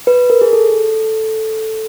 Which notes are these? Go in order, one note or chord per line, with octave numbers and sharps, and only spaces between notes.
B4
A#4
G#4
A4